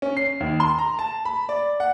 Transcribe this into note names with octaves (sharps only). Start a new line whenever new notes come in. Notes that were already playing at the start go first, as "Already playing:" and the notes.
C#4
C7
D#2
C6
A#5
A5
B5
D5
F#5